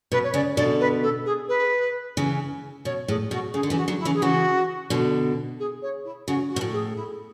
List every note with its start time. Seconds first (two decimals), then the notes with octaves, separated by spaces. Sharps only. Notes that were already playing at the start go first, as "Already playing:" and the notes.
0.12 B2 B4
0.23 C#5
0.34 C#3 D5
0.57 B2 D3 D5
0.80 B4
1.02 A4
1.25 G#4
1.48 B4
2.17 C#3 E3
2.85 B2 C#5
3.08 A2 G#4
3.31 B2 F#4
3.53 C#3 G#4
3.63 D3
3.70 C#3 E3
3.76 F#4
3.88 D3 F#3
3.99 E4
4.05 C#3 E3
4.14 G#4
4.22 C#3 E3 F#4
4.90 B2 D3
5.59 G#4
5.82 C#5
6.04 E4
6.27 C#3 F#4
6.50 F#4
6.56 B2
6.61 A2
6.72 G#4
6.95 E4